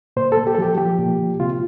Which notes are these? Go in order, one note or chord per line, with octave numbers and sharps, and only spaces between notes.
A#2 C5
A#2 A4
G4
A4
F3 G4
F3 G4
A#2
A#2
C3 F4